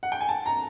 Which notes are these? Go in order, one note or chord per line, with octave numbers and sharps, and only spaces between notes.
F#5
G5
G#5
A5
A#5